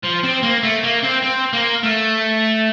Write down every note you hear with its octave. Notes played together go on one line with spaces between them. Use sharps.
F3
C4
A#3
A3
A#3
C4
C4
A#3
A3